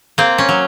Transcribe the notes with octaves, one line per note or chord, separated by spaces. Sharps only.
A#3 C4
C#4
F#3